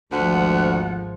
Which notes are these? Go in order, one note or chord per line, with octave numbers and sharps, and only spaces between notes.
G#1 D2 F3 F#5